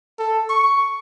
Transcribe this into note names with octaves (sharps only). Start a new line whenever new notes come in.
A4
C#6